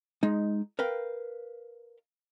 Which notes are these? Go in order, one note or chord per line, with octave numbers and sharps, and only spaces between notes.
G#3 D#4
A#4 B4 F5 G5